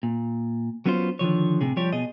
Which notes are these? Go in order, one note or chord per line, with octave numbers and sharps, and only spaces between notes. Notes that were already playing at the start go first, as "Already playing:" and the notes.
A#2
F#3 B3 C#4 F4 C5
D3 D#3 F3 C#5
A2 C3 G#4
F3 G3 G4 C#5
B2 G#4 D#5